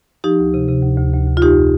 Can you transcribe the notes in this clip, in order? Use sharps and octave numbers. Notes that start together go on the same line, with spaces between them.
F3 D#4 G4
D2
C3
C3
D2
D2
D2
D2
F4
F2 D#4 G4